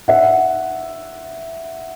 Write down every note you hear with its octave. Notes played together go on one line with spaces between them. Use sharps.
E5 F#5